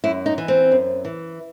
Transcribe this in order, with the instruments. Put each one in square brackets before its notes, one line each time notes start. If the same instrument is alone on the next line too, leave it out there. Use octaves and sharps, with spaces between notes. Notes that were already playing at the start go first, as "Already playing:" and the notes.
[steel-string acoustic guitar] F#2 E4
D#4
E3
C4
F#2
E3